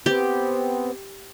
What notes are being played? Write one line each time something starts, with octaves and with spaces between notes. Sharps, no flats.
B3 C4 G4